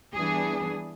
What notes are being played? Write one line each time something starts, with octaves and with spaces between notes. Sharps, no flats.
E3 G3 B3 D4 G#4